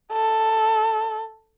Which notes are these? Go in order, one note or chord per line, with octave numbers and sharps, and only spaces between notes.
A4